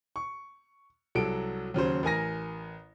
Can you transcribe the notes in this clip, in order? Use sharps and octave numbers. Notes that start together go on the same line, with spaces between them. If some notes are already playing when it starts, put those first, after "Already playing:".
C#6
C2 F#3 A4 D7
D#2 C#3 F#3 C5
A1 A#4 G#5 A#6